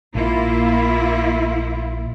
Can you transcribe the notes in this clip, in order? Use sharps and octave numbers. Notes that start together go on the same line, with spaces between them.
A#1 A#3 E4 F4